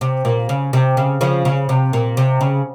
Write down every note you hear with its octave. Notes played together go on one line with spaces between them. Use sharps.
C3
A#2
C#3
C3
C#3
C#3 F3
C#3
C3
A#2
C3
C#3